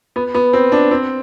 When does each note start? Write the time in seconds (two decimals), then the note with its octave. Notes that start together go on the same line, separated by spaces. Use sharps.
0.16 B3
0.34 B3
0.53 C4
0.72 D4
0.91 C4